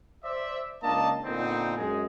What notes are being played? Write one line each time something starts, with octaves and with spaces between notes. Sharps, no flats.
C5 D5 E5
C#2 A#3 D4 D#5 A5
A#2 D3 B3 C4 D#4
F#2 G#3 G#4